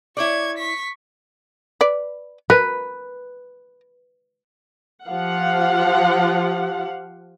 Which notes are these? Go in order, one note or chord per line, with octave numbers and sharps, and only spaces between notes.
E4 C#5 D5 C#6 G#6
C#6 B6
B4 D5
A#4 B4
F3 G4 F5 F#5